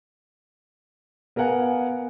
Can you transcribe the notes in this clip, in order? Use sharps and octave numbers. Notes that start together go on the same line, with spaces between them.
B3 A#4 F5 F#5 G#5